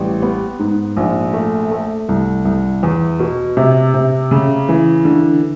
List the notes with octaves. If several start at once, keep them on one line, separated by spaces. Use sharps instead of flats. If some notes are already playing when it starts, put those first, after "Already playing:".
Already playing: A1 G3
B3
G#2
A#1
A3
A3
C2
C2
E2
B2
C3
C3
C#3
E3
D3